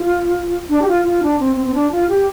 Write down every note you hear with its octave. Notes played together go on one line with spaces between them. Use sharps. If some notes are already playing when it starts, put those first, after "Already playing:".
Already playing: F4
D4
G4
F4
F4
D4
C4
C4
C4
D4
F4
G4